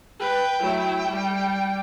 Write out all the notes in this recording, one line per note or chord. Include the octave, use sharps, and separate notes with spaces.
B4 G5
F#3 A3 E4
G3